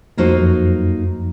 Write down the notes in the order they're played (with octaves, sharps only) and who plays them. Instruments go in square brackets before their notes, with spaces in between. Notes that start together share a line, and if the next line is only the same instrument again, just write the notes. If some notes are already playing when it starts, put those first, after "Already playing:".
[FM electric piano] F2 F3 [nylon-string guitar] A#3 D#4 F#4 A4 C5
[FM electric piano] F#2 F#3